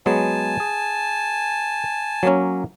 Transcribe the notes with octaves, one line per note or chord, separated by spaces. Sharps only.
F#3 G#3 B3 G#5 A5
G#4
F#3 A#3 C#4